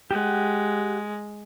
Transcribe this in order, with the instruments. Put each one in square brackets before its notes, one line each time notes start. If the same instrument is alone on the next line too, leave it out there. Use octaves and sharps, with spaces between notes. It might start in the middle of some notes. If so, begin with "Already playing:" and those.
[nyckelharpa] G#3 [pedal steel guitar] G4 F#5